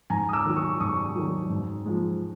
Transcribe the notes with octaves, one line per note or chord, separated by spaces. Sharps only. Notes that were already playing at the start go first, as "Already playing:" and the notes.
G#2 G#5 A#5
D#6
D6 E6
D#3 F#3
C#6 D#6
G#2 C#6 D#6
D#3 F#3
G#2
F3 G#3